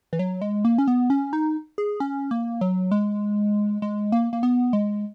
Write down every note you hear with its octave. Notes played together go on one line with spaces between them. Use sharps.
E3
F#3
G#3
A#3
C#4
B3
C#4
D#4
G#4
C#4
A#3
F#3
G#3
G#3
A#3
A#3
B3
G#3